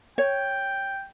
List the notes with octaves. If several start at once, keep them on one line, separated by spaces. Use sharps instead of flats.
C#5 G5